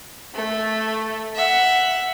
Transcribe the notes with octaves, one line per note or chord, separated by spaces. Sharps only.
A3
E5 F#5